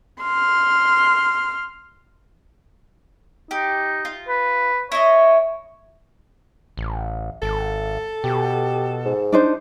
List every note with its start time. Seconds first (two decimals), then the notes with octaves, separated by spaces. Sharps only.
0.21 C6 F6
3.51 D#4 G4
4.05 F4
4.28 B4
4.92 E4 C#5 D#5
6.77 A1
7.42 G#1 A4
8.24 B2 G4
9.05 G#2
9.32 D4 D#4 C5